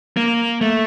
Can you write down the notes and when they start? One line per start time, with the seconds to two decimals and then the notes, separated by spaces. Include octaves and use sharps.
0.17 A#3
0.61 A3